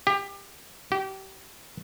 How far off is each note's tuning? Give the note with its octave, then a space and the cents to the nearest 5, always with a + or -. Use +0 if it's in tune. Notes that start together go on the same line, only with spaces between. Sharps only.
G4 +20
G4 -30